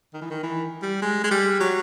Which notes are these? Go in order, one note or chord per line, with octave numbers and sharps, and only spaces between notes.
D#3
E3
D#3
E3
G3
G#3
G#3
G3
F#3